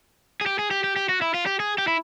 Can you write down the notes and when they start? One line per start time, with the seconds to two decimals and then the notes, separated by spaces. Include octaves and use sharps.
0.41 G#4
0.46 G4
0.59 G#4
0.71 G4
0.84 G4
0.96 G4
1.09 F#4
1.22 E4
1.34 F4
1.46 G4
1.60 G#4
1.78 G4
1.87 E4